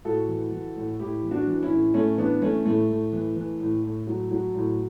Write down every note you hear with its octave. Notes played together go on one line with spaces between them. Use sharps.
A2 F#4 A4
E3
E3
A2
A2 E4 G4
E3
D4 F#4
E3
C#4 E4
A2
A2 A3 C#4
E3 B3 D4
E3 A3 C#4
A2 A3
A2
E3
E3
A2
A2
F#3
F#3
A2